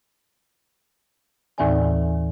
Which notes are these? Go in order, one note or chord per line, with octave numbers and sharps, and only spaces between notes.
D#2 A2 E3 C4 D5 G#5